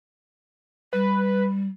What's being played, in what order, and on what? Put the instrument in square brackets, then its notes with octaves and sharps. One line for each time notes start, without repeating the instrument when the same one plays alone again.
[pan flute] G3 [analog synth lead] B4